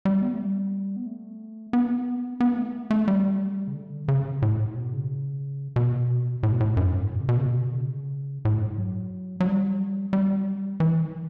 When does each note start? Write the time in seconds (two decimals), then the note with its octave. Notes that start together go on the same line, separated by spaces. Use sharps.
0.05 G3
0.22 B3
0.33 A3
0.39 G3
0.96 B3
1.06 A3
1.73 B3
2.40 B3
2.57 A3
2.91 A3
3.08 G3
3.68 C#3
3.74 D3
4.08 C#3
4.42 A2
4.75 B2
4.93 C#3
5.76 B2
6.43 A2
6.52 B2
6.60 A2
6.77 F#2
6.89 G2
6.99 A2
7.11 B2
7.20 C#3
7.29 B2
7.37 C#3
7.47 B2
7.73 D3
7.78 C#3
8.45 A2
8.61 G2
8.78 F#3
9.40 F#3
9.46 G3
10.13 G3
10.80 E3